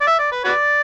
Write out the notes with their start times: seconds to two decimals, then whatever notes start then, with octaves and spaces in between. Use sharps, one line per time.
0.01 D5
0.07 E5
0.19 D5
0.32 B4
0.45 F#4 B4 D5